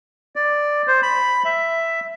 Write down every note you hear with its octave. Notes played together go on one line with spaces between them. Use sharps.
D5
C5
B5
E5